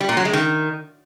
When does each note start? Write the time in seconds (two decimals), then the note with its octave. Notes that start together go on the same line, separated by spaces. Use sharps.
0.01 G3
0.09 A#2
0.17 F#3
0.25 G#3
0.33 D#3